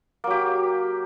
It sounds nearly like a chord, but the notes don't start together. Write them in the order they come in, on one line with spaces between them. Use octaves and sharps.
A#3 F#3 G4